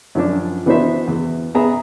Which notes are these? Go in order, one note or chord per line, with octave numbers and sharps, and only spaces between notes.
F#2 F3 D4
E3 B3 D4 F#4 C5 E5
E2 E3
B3 G#4 E5 A#5